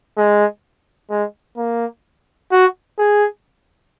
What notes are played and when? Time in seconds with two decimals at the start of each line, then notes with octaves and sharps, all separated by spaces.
0.17 G#3
1.10 G#3
1.57 A#3
2.52 F#4
2.99 G#4